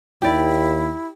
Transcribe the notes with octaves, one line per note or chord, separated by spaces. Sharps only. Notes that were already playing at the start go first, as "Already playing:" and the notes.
D#2 E4 G4 D5